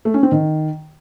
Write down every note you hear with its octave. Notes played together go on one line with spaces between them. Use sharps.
A3
C#4
C4
D#3